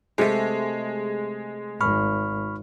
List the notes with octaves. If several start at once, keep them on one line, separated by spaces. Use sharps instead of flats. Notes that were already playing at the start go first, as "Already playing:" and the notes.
C3 G#3 A3
G#1 B5 C#6 F6